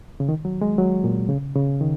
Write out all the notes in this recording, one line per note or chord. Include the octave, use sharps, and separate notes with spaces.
C#3
D#3
F#3
G#3
F#3
A#2
C#3
C#3
D#3